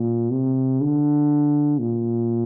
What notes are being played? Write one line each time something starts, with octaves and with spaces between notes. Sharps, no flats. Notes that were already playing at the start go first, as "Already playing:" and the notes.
Already playing: A#2
C3
D3
A#2